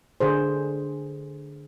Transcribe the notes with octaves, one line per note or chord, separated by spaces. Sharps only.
D3 G#4 C5